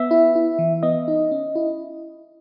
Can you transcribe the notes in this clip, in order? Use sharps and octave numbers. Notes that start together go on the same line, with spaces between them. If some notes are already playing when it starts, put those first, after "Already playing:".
Already playing: B3 E5
E4
E4
E3
B3 D#5
D#4
C#4
E4